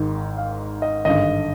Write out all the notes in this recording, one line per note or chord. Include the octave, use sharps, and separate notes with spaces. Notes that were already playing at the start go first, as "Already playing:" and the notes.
Already playing: G#1 G#2 D#3
F5
D#5
G#1 G2 D3 D#5